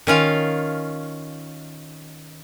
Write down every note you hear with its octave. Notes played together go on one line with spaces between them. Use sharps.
D#3 C#4 F4 F5